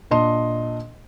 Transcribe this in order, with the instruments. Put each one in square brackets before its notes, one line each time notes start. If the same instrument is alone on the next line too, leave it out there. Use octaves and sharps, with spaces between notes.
[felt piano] A#2 D4 D#5 C6